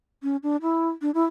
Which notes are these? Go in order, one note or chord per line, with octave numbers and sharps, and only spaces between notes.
C#4
D4
E4
D4
E4